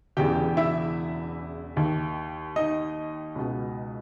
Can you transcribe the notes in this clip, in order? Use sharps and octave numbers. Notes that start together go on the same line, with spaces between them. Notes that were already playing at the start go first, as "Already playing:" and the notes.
E1 E2 C#3 E3 G4 G5
E4 E5
D#2 D#3
D#4 D#5
C#2 B2